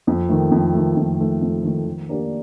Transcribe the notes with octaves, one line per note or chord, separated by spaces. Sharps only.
F2
D#3 A3
F2
D#3 A3
F2
D#3 A3
F2
D#3 A3
D#3
A#3 D4 G4 D5